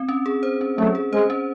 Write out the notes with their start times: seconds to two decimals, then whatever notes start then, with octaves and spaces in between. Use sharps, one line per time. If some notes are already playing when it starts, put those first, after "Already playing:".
Already playing: C4
0.09 C#4
0.26 G#4
0.43 C5
0.61 C#4
0.78 F#3 A3 C#4
0.95 G#4
1.13 G#3 C5
1.30 C#4